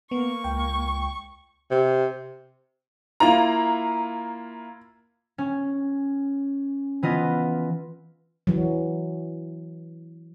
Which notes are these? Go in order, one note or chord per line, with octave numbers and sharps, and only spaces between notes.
A#3 B3 C#6
C#2 G5
C3
A#3 E4 F4 A#5
C#4
E3 B3 F4 D#5
E3 F#3